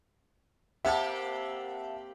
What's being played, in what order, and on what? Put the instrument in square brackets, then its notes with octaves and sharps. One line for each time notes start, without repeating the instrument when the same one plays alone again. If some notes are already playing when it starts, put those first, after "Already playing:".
[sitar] A#3 C4 G4 [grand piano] E5 F#5 A5